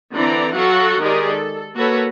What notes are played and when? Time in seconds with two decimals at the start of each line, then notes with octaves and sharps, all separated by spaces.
0.12 D3 E3 C4 D5 A#5
0.53 F#3 F#4 A4 F5 F#5
0.99 D#3 G#3 G4 G#4 A#4 D5
1.28 A4
1.75 A#3 F#4 A4 B4 C#5